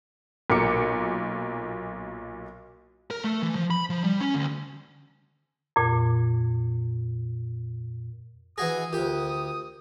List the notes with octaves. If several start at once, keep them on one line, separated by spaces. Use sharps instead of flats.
B1 A#2 A#4 D6 C#7
A#4
A3
E3
F3
B5
F3
G3
C#4
D2
F2 A#2
E3 F#4 G#4 D#6 A#6
D2 F4 G4 A#4